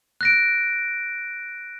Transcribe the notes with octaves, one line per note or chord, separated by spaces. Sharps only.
F#6 A#6 D7